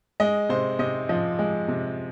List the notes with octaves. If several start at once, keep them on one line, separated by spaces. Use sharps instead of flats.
G#3 D#5
C3 C5
C3 D#5
F3 D#5
G#3
C3